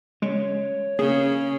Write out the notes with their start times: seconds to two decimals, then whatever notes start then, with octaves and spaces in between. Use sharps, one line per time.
0.22 C#3 G#3 C#5
0.99 C#3 A#3 G#4